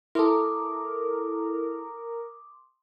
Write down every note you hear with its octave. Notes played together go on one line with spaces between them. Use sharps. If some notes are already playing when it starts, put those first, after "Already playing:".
E4 A4 A#4 C6 D6 D#6